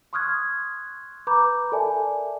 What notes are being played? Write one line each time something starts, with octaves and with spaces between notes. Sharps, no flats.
C6 C#6 D#6 F6 F#6 G#6
B4 A#5 B5 D6 G6
A4 A#4 D5 E5 G#5 A5